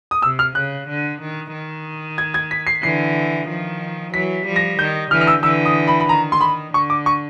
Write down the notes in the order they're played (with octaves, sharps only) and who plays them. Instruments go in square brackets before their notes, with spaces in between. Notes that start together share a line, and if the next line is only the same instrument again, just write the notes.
[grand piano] D#6
[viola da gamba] C3 [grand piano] E6
[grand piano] F6
[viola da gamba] C#3 [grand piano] F#6
[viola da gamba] D3
D#3
D#3
[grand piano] G#6
G#6
B6
C7
[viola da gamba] D3 E3 [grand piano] C7
[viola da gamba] D#3 F3
[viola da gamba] E3 F#3 [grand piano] B6
[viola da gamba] F3 G3
[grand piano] A#6
[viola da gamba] D#3 [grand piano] G6
[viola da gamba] D3 E3 [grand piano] F6
[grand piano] F6
E6
[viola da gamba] D3 E3 [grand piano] E6
[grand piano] D#6
B5
B5
[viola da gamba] D#3 [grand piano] A#5
[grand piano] C6
B5
[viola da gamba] D3 [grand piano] C#6
[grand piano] D6
C#6